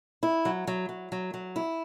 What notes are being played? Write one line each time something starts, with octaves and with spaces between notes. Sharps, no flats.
E4
F#3
F#3
F#3
F#3
F#3
E4